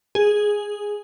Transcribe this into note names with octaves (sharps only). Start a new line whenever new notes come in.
G#4